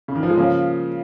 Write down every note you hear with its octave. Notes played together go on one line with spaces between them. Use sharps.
C#3
D#3
F3
G#3
C#3 F3 A#3